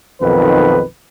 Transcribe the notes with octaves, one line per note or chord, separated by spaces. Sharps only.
B1 F2 D#3 B4